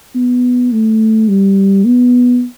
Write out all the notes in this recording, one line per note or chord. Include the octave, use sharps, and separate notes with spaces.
B3
A3
G3
B3